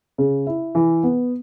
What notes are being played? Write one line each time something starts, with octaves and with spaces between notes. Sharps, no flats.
C#3
E4
E3
B3